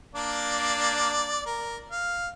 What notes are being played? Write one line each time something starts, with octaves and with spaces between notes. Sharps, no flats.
A#3 D4 D5
A#4
F5